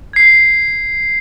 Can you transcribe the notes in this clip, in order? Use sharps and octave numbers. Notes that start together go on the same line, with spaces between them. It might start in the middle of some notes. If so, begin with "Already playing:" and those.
G#6 C7